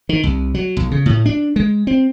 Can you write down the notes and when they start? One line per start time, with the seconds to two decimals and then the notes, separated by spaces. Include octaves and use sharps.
0.09 D#3
0.23 C2
0.54 F#3
0.77 B1
0.91 C#3
1.06 A2
1.26 D4
1.56 G#3
1.87 C4